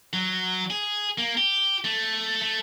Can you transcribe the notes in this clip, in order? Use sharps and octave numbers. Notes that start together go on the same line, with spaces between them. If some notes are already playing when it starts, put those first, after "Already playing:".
F#3
G#4
A#3
G4
A3
A3